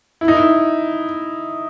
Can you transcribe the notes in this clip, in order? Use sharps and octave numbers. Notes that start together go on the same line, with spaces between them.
E4
D#4
E4